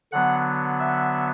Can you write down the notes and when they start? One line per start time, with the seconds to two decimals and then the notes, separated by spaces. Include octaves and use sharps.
0.12 D3 F#3 B3 F#5
0.80 E5